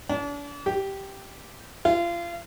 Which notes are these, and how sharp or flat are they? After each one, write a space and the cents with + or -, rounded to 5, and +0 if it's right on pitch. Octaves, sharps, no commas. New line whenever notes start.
D4 -40
G4 -5
F4 -30